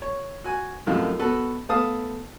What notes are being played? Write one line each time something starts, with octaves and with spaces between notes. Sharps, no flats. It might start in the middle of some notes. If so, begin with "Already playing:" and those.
C#5
F#4 G#5
F#2 A2 C3 D#3 F3 F4
B3 F#4 A4 B4
A3 B3 F5 A5 D#6